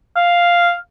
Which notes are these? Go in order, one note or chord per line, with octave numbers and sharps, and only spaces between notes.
F5